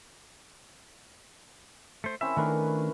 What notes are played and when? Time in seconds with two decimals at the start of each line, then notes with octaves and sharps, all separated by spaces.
2.04 A3 C5
2.21 C4 C#4 E4 E5
2.37 D#3 A3 D4 E4 A#4 B4